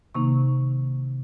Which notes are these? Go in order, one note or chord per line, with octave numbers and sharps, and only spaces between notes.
C3 D#3 A#3 D#4 C#6